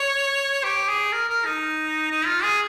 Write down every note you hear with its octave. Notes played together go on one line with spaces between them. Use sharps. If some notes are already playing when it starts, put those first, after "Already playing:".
Already playing: C#5
G4
G#4
A#4
A#4
D#4
D#4
F4
G#4